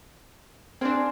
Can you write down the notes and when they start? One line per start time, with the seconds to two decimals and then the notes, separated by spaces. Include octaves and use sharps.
0.81 C4 D4 G#4 C5 F5